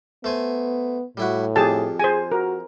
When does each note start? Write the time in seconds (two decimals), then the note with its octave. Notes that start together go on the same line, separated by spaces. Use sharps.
0.24 A3 B3 C5 G#5
1.17 A2 G3 E4 F#4
1.56 F2 G4 G#4 A5
1.99 G#4 C5 G#5
2.32 F#4 A#4